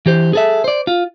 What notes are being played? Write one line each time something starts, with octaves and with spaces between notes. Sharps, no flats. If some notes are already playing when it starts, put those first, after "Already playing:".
E3 G4 C5
G#4 A4 E5
C5 D5
F4